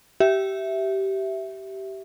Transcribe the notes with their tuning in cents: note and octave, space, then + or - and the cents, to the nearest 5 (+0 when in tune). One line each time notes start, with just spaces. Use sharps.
G4 -20 E5 +0